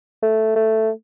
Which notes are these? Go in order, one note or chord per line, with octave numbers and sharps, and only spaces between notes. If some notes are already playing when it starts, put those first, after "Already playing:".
A3
A3